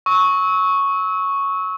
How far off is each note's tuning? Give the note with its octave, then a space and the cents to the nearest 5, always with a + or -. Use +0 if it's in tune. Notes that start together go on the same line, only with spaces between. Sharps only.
C#6 +0 E6 -30